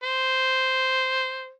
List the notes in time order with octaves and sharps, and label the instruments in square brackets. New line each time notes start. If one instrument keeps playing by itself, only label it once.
[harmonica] C5